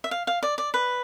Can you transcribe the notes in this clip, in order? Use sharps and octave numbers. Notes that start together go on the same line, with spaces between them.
E5
F5
F5
D5
D5
B4